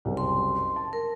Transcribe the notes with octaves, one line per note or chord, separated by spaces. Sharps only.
F#1 C2
C6
A5
A#4